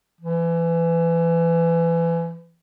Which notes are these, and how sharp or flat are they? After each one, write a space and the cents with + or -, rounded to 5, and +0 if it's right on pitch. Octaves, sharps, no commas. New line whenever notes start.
E3 +25